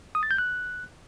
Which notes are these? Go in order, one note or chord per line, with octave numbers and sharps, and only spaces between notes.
D#6
A6
G6
F#6